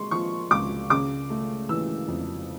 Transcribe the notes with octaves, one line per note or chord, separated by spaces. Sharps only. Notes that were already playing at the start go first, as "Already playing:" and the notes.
Already playing: G#3 C6 C#6
F3 C#6
C#2 D6
C#3 D6
A3
E3 E6
F2